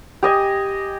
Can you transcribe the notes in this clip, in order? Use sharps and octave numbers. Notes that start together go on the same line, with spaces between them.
G4 D#5 G#5